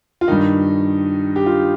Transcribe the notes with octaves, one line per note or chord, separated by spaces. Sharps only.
F4
G2 D#3 D#4
G4
F4